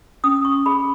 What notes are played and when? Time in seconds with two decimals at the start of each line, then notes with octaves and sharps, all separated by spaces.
0.24 C#4 D#6
0.45 C#6
0.66 G#4 B5